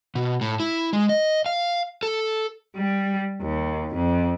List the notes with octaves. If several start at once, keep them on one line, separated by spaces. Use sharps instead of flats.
B2
A2
E4
G#3
D#5
F5
A4
G3
D#2
F2